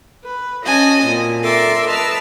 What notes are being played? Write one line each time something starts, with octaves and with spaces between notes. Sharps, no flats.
B4
C#4 F#4 D#5 G#5 A5
A#2 C4
A4 A#4 E5 C6 D6
B4 D#5 A5 E6 F6